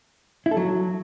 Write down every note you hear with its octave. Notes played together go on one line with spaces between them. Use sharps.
E4
A4
F#3